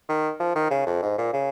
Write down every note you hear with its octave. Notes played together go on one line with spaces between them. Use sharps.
D#3
F3
D#3
C#3
F2
G#2
A#2
C#3